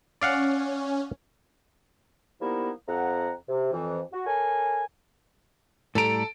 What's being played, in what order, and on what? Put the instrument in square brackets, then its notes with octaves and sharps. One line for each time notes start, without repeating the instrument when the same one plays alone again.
[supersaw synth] C#4 [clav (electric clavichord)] D5 F5 F#5
[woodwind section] F3 G3 A#3 B3 D#4 E4
F2 F#5 A#5
C3
F2 E3
F#4
A4 A#4 C#5 G#5
[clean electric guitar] A2 G3 A#5 [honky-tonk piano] A4 D7